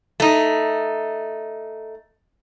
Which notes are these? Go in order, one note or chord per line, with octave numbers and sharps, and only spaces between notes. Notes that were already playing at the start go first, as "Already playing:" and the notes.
A3 D#4